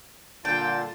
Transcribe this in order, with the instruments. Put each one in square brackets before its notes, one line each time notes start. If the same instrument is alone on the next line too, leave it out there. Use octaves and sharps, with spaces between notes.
[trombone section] A#2 D3 [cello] F4 [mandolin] G5 [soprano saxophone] A5